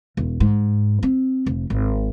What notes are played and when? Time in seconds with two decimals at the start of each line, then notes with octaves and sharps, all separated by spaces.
0.17 E1
0.40 G#2
1.03 C4
1.46 F1
1.70 G#1